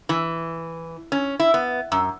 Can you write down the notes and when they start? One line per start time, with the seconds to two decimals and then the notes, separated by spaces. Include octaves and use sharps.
0.09 E3
1.12 C#4
1.40 E4
1.54 B3
1.92 F#2